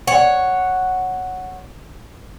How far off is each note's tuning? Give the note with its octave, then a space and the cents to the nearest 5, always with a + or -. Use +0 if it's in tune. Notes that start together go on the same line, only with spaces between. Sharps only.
C#5 +0 F#5 +0